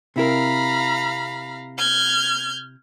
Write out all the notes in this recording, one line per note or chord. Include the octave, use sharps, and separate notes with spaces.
C3 E4 A#4 F5 A#5 B5
F6 G6 G#6